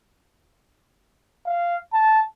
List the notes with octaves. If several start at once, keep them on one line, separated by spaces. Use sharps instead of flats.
F5
A5